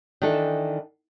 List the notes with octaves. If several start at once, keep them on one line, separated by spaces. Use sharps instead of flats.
D#3 E3 D4 A4